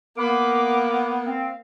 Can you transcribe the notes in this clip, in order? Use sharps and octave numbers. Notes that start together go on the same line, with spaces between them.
A#3 B3 F5 B5 D6
C4 F5